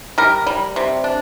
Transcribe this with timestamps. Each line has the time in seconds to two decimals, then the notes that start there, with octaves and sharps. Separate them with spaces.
0.18 G3 A#4
0.47 G3
0.76 C3
1.04 D4